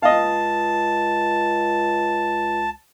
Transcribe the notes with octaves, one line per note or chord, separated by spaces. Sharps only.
C#2 D#5 F5 A5